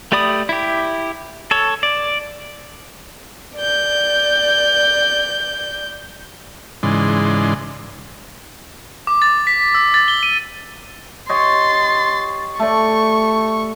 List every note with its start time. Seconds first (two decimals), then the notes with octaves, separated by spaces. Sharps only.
0.12 A3 G4 D5 B5 D#6
0.49 E4 G4
1.51 A4 C#5
1.83 D5
3.56 D5 G6
6.83 G#2 C#3 E3 G#3 D5 C6
9.07 D6
9.22 A6
9.47 B6
9.75 E6
9.94 A6
10.08 G7
10.23 D#7
11.29 G4 C#5 D#5 C6 A6
12.59 A3 D5 C#6